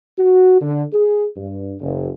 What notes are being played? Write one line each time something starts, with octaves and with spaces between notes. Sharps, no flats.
F#4
D3
G#4
G2
F#1